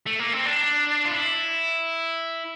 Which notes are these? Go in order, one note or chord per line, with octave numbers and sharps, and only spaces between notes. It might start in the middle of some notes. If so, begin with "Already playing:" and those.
A3
A#3
C4
D4
F4
E4